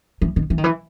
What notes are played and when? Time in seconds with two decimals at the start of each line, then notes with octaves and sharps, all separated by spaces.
0.22 E3
0.36 D#3
0.50 E3
0.58 D#3
0.64 E3